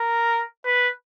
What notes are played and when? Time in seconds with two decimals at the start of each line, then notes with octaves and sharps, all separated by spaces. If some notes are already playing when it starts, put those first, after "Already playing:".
Already playing: A#4
0.65 B4